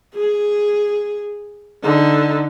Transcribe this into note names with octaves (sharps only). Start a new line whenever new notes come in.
G#4
D3 D#4